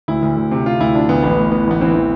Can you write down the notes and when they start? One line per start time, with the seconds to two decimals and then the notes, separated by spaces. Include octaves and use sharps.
0.08 D2 E4
0.22 D2
0.37 D2
0.51 C3
0.65 C3 F4
0.80 D2 E4
0.94 F3 D4
1.09 D2 B3
1.23 A1 B3
1.38 A2
1.51 E3 B3
1.67 A1 B3
1.81 E3 C4
1.95 E3